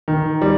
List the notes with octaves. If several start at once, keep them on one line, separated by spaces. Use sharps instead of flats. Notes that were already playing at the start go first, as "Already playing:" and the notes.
D#3
G3